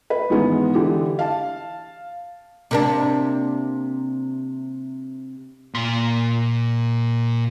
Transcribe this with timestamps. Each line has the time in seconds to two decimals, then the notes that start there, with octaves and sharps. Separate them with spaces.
0.10 B4
0.30 G#2 D#3 E3 G#3 B3
0.74 D3 E3 G4
1.19 F5 A5
2.71 C3 A#3 D4
5.74 A#2 C6